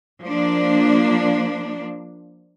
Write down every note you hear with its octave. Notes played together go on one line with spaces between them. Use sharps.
F3 A#3 D4